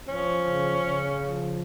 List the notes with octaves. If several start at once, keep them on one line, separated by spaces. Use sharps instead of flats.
F3 C#4
C#3
C#3
F3